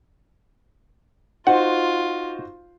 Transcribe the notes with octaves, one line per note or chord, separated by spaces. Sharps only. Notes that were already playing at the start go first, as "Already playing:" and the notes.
D#4 F4 F#4 C5 F#5